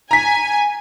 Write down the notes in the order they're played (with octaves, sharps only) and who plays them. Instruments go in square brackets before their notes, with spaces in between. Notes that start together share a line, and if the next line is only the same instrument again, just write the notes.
[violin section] G#5 [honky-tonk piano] A#5 B6